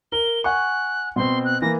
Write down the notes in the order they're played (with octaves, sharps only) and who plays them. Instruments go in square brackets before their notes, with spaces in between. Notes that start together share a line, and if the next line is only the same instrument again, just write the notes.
[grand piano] A#4 [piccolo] G7
[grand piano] F#5 G#5 C#6 [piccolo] F#6
[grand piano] B2 C4 [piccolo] C6
[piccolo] F#6
[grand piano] E3 A#3 [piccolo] A#6